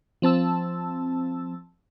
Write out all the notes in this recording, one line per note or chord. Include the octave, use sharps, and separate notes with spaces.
F3 C4 A5 E6